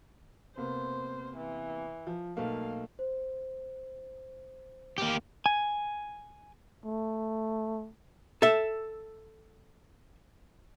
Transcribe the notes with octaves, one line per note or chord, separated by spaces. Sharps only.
C3 A#3 B3 C5
E3
F3
B1 A3 A#3 F5
C5
A#3 G4
G#5
A3
A4 E5